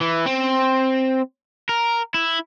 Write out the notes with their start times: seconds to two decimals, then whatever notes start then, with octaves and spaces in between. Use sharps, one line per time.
0.01 E3
0.26 C4
1.69 A#4
2.14 E4